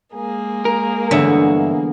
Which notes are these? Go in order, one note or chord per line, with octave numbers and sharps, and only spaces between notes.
G#3 A#3 G#4
A#4
E2 G2 D3 B3 C#5 E5